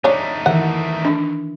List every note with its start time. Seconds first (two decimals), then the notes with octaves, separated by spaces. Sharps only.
0.04 A3 D4 D#4 C#5
0.46 D#3 E3 E5 F#5
1.05 D4